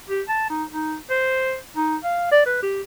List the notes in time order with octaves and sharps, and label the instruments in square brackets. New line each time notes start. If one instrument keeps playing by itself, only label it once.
[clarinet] G4
A5
D#4
D#4
C5
D#4
F5
D5
B4
G4